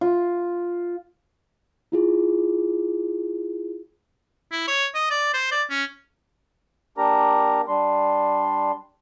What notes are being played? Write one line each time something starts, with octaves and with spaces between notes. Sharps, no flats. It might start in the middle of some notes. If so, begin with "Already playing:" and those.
F4
E4 F4 G#4
E4
C#5
D#5
D5
C5
D5
C#4
A#3 D4 G4 A#4 A#5
G3 D4 C6